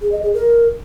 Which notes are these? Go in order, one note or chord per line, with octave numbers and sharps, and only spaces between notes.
G#4
D#5
G#4
A#4